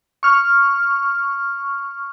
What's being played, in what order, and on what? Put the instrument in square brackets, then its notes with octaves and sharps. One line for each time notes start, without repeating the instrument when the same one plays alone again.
[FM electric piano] C#6 F6